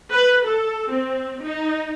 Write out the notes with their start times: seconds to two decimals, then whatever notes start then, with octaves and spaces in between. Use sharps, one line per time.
0.12 B4
0.46 A4
0.92 C4
1.42 D#4